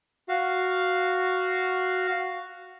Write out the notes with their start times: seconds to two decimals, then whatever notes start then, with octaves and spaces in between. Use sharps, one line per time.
0.29 F#4 F5